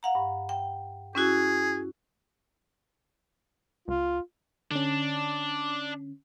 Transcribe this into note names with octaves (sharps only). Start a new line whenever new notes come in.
F5 F#5 A#5
G2
G5
C#4 E4 F#4 G#4
C#2 F4
D3 C#4 D4